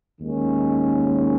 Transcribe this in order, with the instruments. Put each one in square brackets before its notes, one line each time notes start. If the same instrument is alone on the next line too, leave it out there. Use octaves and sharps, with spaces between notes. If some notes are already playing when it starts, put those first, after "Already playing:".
[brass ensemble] D#2 D#3 G#3 C#4